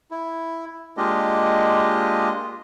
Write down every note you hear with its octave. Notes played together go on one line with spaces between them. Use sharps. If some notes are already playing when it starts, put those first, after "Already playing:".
E4
G#3 A#3 D4 F4 G4 D#5